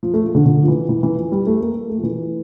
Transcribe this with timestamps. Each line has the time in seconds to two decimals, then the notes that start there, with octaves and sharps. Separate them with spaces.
0.03 F3
0.14 A3
0.25 F3
0.35 D3
0.45 D3
0.63 F3
0.68 E3
0.89 E3
1.03 E3
1.17 F3
1.32 G3
1.47 A3
1.61 A#3
1.90 A3
1.98 F3
2.03 E3